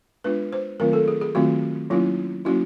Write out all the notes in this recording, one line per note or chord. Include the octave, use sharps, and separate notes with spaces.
G#3 B3 D4 F4 B4
C5
D#3 F#3 A3 C4 F4 A#4
A4
G#4
G#4
D#3 F#3 A3 C4 F4 F#4
F#3 A#3 C#4 E4 F4
F#3 A#3 C#4 E4 F#4